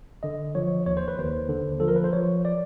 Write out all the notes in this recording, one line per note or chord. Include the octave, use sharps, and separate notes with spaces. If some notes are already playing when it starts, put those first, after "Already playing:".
D3 D#5
F3 C#5
D#2 C#5
C5
B4
D#2 C5
D3
F3 A4
A#4
B4
C5
F3 C#5
D5